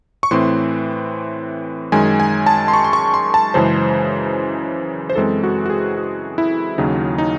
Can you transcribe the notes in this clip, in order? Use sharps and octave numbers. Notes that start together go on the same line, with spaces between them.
C#6
A2 E3 C4 C6
F#2 D#3 G#3 G#5
G#5
A5
C6
C#6
C6
C#6
C6
A5
F#2 C#3 E3 G#3 C5
C5
F#2 E3 G#3 C4 A4
F#4
F#4
G#4
F#4
E4
D#2 C#3 F#3 D#4
D#4